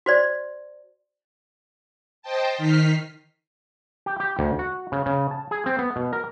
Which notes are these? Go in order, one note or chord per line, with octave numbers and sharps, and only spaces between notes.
F#4 C5 D5
C5 D#5 G5 A5
D#3 D#4 F6 B6 C7
G4
G4
D2
F#4
C#3
C#3
A5
G#4
C4
B3
B2
A#4